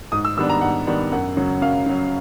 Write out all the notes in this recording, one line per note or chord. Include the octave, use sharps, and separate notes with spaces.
G#2 D#6
E6
D#3 G3 B3 D4 E6
A#5
G#2 F#5
D#3 G3 B3 D4
F#2 F#5
C#3 F#3
F#2 F5
C#3 F#3